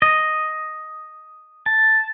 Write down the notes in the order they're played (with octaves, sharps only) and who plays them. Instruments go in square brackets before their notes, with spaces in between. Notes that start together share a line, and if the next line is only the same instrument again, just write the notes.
[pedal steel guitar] D#5
A5